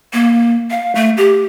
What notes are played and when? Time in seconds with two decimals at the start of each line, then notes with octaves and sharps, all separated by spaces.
0.13 A#3
0.70 F5
0.95 A3
1.17 G4